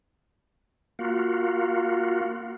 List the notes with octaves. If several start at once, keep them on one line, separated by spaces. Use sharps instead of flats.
A#3 F4 F#4